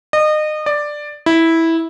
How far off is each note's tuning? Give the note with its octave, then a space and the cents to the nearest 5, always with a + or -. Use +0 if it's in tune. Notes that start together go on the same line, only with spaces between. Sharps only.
D#5 -30
D5 +10
E4 -10